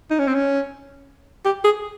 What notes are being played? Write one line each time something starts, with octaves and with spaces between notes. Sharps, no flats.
D#4
C#4
C4
C#4
G4
G#4